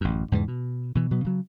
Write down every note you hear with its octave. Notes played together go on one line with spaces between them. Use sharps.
A1 F#2
E2 G#2 C#3 E3
B2
B2 E3
B2 F#3 B3
C#3 F#3